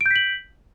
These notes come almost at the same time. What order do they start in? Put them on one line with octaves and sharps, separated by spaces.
D7 G6 B6 F#7